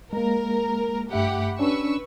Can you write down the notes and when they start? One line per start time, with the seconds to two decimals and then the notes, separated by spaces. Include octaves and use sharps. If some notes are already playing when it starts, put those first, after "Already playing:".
0.13 G#3 A#3 A#4
1.13 G2 A3 G4 E5 F#5 B5
1.59 C#4 D4 B4 C#6 E6